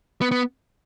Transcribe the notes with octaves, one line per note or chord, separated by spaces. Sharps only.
B3
B3